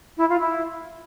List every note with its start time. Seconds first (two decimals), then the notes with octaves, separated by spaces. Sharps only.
0.18 E4
0.29 F4
0.39 E4